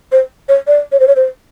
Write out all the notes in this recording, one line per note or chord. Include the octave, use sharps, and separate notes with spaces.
C5
C#5
D5
C#5
C5
C#5
C5